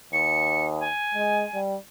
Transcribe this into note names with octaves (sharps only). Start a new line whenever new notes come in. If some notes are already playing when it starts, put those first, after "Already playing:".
D#2 C#7
G#5
G#3
G3